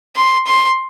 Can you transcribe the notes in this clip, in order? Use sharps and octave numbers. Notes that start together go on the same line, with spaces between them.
C6
C6